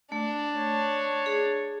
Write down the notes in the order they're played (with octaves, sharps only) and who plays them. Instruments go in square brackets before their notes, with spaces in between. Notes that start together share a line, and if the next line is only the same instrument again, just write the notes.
[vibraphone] A3 [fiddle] D4
[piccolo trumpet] C#5
[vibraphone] G#4